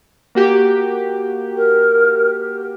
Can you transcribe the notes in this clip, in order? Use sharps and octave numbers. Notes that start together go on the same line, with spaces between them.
A#3 F#4 G4
A#4